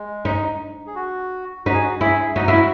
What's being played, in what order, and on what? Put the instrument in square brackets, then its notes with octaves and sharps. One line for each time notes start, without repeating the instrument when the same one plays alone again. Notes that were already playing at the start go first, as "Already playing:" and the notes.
Already playing: [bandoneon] G#3
[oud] D#4
[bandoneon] G#4
F#4
[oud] D#4 [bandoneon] F#4
[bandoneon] G#4
F#4
[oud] E4 [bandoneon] G#4
[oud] D#4 [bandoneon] F#4
[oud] E4